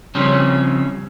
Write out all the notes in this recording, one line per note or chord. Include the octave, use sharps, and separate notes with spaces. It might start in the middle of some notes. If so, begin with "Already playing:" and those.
C#3 F3 G3 C4 C#4